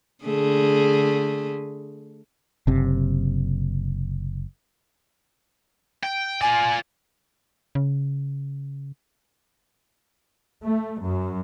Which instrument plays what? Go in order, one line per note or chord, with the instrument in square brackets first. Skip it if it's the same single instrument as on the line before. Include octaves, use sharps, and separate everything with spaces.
[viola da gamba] D3 A3 G#4
[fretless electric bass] F#1 C3
[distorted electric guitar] G5
[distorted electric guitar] F4 D5 [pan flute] G#5
[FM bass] C#3
[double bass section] A3
F#2